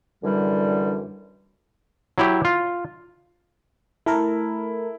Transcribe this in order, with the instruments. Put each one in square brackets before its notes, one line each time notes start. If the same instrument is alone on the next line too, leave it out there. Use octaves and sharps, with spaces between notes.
[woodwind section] F#2 D3 E3 G3
[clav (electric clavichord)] F#3 E4 G4
F4
[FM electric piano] A3 A4 A#4 [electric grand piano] E4